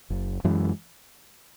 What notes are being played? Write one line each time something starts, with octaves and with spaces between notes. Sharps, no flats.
F#1
F#2 E3 G#3